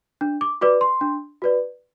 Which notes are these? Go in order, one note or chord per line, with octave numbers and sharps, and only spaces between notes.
D4
D6
F#4 B4 D5 D6
C6
D4
F#4 B4 D5